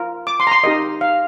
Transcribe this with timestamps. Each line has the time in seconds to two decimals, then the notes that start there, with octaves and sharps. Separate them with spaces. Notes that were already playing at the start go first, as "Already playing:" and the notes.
Already playing: F4 A#4
0.27 D6
0.40 C6
0.47 A#5
0.52 C6
0.64 D#4 G4 A#4 D#5
1.01 F5